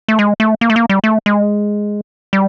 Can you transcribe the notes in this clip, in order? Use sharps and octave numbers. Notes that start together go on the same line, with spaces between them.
A3
G#3
A3
A#3
A3
A#3
G3
A3
G#3
G3